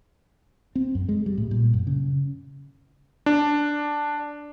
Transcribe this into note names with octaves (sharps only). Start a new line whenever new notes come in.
C4
F#2
G#3
G3
A2
A#2
F#2
C#3
D4